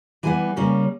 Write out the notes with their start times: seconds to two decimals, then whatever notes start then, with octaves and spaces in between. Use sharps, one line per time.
0.23 E3 G3 B3 G#5
0.56 C#3 G3 A#3 C#4